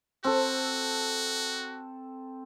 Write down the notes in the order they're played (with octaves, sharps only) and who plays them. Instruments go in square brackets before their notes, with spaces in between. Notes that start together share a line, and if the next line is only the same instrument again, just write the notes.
[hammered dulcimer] C4 A4 [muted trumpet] F#4